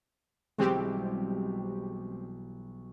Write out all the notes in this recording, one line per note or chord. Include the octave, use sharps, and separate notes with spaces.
B1 E3 G3 G#3 C4 G4